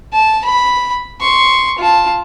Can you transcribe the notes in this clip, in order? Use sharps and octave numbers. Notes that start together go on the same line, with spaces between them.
A5
B5
C6 C#6
F4 A5